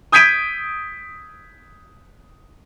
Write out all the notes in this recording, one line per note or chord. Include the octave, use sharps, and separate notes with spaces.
D#6 G6 G#6 B6 D7 D#7